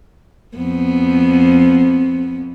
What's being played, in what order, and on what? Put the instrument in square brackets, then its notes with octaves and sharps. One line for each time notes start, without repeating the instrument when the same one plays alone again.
[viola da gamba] F2 B3